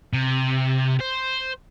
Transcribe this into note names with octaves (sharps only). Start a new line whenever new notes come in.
C3
C5